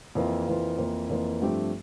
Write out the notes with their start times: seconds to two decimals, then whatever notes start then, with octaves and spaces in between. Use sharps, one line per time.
0.15 F2 E3 A#3 F4
0.47 F2 E3 A#3 F4
0.78 F2 E3 A#3 F4
1.09 F2 E3 A#3 F4
1.42 G2 F3 A3 C4 G4